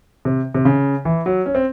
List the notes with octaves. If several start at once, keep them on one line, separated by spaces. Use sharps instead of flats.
C3
C3
C#3
E3
F#3
C#4
C4